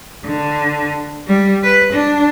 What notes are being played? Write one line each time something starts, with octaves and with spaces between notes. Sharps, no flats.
D3
G3
B4
D4